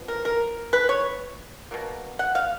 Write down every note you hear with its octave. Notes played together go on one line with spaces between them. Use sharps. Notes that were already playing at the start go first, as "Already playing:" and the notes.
Already playing: F3 B3
A#4
A#4
B4
C#5
B2 F#3 A#3
F#5
F5